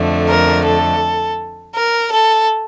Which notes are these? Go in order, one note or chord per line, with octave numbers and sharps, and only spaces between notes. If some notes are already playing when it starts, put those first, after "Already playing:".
Already playing: F2 D3 A3
A#4
A4
A#4
A4